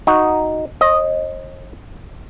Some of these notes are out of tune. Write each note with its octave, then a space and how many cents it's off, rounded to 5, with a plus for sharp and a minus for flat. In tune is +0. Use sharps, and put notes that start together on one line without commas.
D#4 +0 F#4 +0
C5 +45 D#5 +0